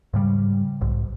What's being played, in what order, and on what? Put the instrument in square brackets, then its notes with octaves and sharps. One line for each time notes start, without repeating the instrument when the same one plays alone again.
[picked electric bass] G#2 C#3 G3
B1 G#2